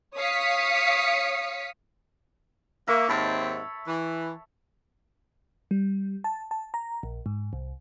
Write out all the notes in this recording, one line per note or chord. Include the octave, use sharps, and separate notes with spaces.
C#5 F5 D#6 B6 C#7
A#3 A#4 E5 C#6
D#2 G#2 C4 C#5 A5 B5
E3
G3
A5
A5
A#5
A#1
G#2
C2